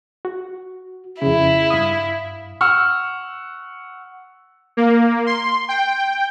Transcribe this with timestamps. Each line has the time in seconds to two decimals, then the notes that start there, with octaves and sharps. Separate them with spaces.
0.25 F#4
1.22 F2 C#3 E4
1.70 G2 F5 D#6
2.61 F#5 C#6 E6 F6
4.77 A#3
5.26 C6
5.69 G5